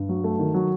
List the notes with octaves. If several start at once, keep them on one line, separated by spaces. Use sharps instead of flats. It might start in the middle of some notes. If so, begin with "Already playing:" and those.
Already playing: G2
F#3
A3
D#3
F#3